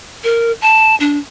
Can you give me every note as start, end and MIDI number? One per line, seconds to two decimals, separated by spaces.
0.24 0.52 70
0.62 0.95 81
1.00 1.18 62